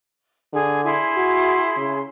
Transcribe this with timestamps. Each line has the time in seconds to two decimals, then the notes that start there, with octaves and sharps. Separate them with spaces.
0.53 D3 G#4
0.83 E4 G#4 C6
1.16 F#4
1.77 C#3